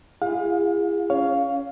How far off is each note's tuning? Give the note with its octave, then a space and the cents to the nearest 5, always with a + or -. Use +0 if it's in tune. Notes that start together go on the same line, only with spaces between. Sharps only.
E4 +40 G#4 -30 F5 +40
C#4 +0 C#5 +20 F5 +0